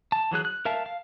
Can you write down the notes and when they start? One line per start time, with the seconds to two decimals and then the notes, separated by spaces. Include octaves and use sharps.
0.12 A5
0.31 E3 F#3 G#4 F#6
0.45 F#6
0.65 A#4 E5 F5 A5
0.86 F5